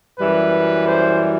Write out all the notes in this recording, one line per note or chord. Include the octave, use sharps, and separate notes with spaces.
F#2 E3 G3 B4
C5